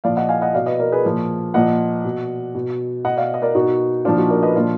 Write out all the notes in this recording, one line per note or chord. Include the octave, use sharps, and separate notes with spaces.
A#2 F3 D5 F5
D#5 F#5
F5 G#5
D#5 F#5
B2 D5 F5
B4 D#5
A#4 D5
G#4 B4
A#2 F3
A#2 F3 D#5 F#5
B2
B2
B2 D#5 F#5
D5 F5
D#5
A#4 D5
B2 D#4 F#4
A#2 F3 D4 F4
D#4 F#4
A#4 D5
B4 D#5
A#2 F3 D4 F4